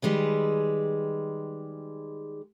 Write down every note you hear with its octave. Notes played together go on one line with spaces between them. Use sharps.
D#3 G3 G#3 G#4 B4